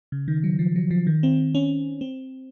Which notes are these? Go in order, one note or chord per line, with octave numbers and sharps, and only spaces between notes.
C#3
D#3
F#3
F3
F#3
F3
D#3
C4
C#4
C4